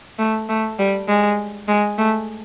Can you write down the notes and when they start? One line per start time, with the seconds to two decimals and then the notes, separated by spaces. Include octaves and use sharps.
0.19 A3
0.49 A3
0.79 G3
1.08 G#3
1.68 G#3
1.98 A3